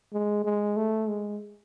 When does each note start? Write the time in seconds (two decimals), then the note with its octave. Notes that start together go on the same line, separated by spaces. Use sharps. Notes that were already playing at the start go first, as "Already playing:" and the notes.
0.13 G#3
0.45 G#3
0.77 A3
1.09 G#3